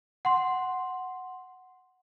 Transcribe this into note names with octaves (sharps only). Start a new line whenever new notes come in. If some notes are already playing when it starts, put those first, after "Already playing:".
F#5 C6